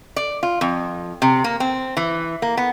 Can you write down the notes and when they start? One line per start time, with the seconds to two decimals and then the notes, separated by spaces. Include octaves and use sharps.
0.16 D5
0.43 F4
0.61 F2
1.22 C3
1.44 A#3
1.60 C4
1.97 E3
2.42 A#3
2.57 B3